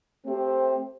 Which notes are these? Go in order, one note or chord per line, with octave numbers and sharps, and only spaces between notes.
A3 C4 G4 C5